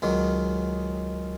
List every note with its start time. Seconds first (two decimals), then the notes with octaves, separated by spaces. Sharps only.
0.02 C#2 D#3 F#3